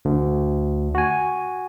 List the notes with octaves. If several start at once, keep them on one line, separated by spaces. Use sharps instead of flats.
D2
F#4 G#5